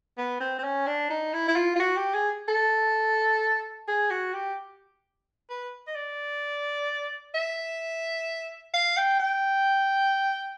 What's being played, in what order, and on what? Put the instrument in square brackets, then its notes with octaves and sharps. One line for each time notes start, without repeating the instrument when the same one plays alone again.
[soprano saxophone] B3
C4
C4
C#4
D4
D#4
E4
E4
F4
F4
F#4
G4
G#4
A4
G#4
F#4
G4
B4
D#5
D5
E5
F5
G5
G5